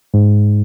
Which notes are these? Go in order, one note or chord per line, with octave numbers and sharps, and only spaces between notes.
G#2